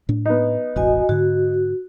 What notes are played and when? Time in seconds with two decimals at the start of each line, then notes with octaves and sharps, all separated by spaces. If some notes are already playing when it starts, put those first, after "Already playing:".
0.09 A2 D4
0.26 B3 D#4
0.76 E1 A1 F#4 D#5 G#5
1.09 G#2 D3 F#4